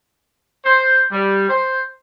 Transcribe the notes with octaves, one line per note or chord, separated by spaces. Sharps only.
C5
G3
C5